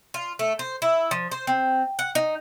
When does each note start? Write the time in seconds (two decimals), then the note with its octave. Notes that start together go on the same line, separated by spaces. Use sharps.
0.14 F4
0.39 A3
0.59 C5
0.82 E4
1.11 F3
1.31 C5
1.47 C4
1.99 F#5
2.15 D#4